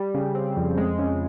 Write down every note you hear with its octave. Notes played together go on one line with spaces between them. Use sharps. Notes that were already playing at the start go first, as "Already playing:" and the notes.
Already playing: G3
C#3
C4
F2
G#3
C#3